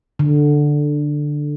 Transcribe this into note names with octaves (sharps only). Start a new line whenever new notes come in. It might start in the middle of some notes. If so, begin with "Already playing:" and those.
D3